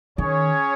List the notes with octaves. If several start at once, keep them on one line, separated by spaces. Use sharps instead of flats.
D#3 C#4 G#4 C#5